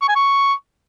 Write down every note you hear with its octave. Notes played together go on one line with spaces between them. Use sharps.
C#6
G#5
C#6